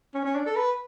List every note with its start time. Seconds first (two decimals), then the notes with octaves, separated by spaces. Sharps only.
0.14 C#4
0.25 C#4
0.35 D4
0.46 A4
0.56 B4